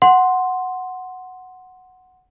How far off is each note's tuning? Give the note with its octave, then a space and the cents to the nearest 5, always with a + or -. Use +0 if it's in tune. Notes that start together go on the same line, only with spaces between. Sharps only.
F#5 +0 C6 +0